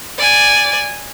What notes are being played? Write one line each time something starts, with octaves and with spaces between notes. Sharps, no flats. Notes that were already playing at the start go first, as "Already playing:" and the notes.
D5 G#5